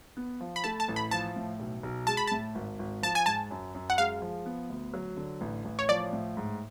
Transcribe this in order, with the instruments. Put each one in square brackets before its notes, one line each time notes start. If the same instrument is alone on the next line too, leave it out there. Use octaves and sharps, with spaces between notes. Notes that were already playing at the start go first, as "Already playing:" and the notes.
[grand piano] B3
F3
[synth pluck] B5
[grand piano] A3 [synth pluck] A5
[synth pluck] A5
[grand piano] A1
[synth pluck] B5
[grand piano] F3 [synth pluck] A5
[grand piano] A2
B1
B1
[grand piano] G#3 [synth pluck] A5
[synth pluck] B5
[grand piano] A2 [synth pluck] A5
[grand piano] G#1
G#1
[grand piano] F3 [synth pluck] A5
[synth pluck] G#5
[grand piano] G#2 [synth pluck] A5
[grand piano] F#2
F#2
[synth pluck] F#5
[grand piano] G#3 [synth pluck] F5
[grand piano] F3
B3
D2
F#3
D3
A1
A1
[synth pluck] C#5
[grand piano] F3 [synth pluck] D5
[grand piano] A2
G#2